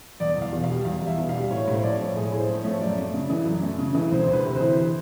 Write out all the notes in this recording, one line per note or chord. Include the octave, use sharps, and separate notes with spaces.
E2 D5
E2
F5
B2
F5
G3
E2 F5
E2 E5
B2
G3 F5
A2 C#5
A2 C5
F3 D5
C#5
A3
A2 G#4
A2
C5
F3
A3 C#5
F#2 D5
A3
C#3
E3
F#2
A3
C#3
E3
D2 C5
D2 C5
B4
C3
C5
E3